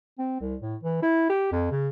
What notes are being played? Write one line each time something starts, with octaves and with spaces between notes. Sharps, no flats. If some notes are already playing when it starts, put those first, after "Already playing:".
C4
C2
A2
E3
E4
G4
F2
C#3